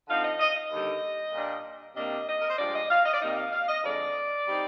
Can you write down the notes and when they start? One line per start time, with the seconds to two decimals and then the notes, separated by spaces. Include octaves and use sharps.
0.08 D3 F3 C4 D#4 F5
0.24 D#5
0.40 D#5
0.56 D#5
0.71 D#2 D3 G3
1.33 A#2 G3 D4
1.96 C3 G3 A#3 D4 D#5
2.28 D#5
2.41 A#4
2.50 C5
2.59 G2 F3 G#3 D5
2.74 D#5
2.90 F5
3.05 D#5
3.14 D5
3.21 C3 G3 A#3 D#4 D#5
3.37 F5
3.52 F5
3.68 D#5
3.84 F2 D3 G#3 D5
4.47 G3 C4 D#4